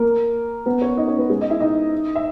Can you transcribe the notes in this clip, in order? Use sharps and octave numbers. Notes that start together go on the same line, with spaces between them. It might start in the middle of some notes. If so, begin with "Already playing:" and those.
Already playing: A#3 A#4
B3 B4
C#4 C#5
D#4 D#5
C#4 C#5
B3 B4
G#3 G#4
D#5
E4 E5
D#4 D#5
E5